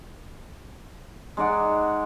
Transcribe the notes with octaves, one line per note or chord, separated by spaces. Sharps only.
G#3 D#4 D5 F#5